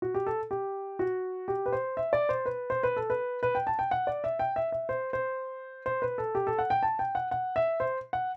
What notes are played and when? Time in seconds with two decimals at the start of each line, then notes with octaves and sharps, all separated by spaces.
0.02 F#4
0.14 G4
0.27 A4
0.51 G4
0.99 F#4
1.48 G4
1.66 B4
1.72 C5
1.97 E5
2.13 D5
2.29 C5
2.46 B4
2.70 C5
2.83 B4
2.96 A4
3.10 B4
3.43 B4
3.55 G5
3.67 A5
3.79 G5
3.91 F#5
4.07 D5
4.24 E5
4.39 G5
4.56 E5
4.72 E5
4.89 C5
5.13 C5
5.86 C5
6.02 B4
6.18 A4
6.35 G4
6.47 A4
6.59 F#5
6.70 G5
6.83 A5
6.99 G5
7.15 F#5
7.31 F#5
7.56 E5
7.80 C5
8.13 F#5